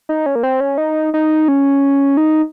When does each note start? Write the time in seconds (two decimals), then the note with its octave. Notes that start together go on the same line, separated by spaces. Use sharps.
0.09 D#4
0.26 C#4
0.35 A#3
0.43 C4
0.60 C#4
0.78 D#4
1.14 D#4
1.48 C#4
2.17 D#4